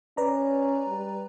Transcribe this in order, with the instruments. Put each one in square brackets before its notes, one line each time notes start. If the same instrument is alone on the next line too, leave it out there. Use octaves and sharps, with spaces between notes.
[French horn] C#4 [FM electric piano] B4 D5 A#5
[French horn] G3